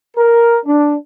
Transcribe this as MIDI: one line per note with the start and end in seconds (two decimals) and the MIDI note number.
0.17 0.57 70
0.66 0.95 62